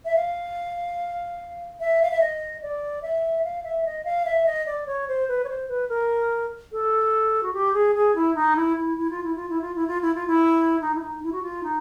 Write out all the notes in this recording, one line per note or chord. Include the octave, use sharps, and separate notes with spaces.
E5
F5
E5
F5
E5
D#5
D5
E5
F5
E5
D#5
F5
E5
D#5
D5
C#5
C5
B4
C#5
C5
B4
A#4
A4
F#4
G4
G#4
G#4
E4
D#4
E4
E4
E4
F4
E4
F4
E4
F4
E4
F4
E4
F4
E4
D#4
E4
D#4
E4
F#4
F4
D#4